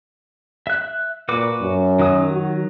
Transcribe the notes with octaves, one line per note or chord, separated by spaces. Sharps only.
E5 F#6
A#2 F#4 B4 D6
F#2
D#3 F#3 D#6
F#4